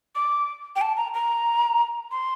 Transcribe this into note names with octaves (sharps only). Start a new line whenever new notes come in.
D6
G5
A5
A#5
A#5
C6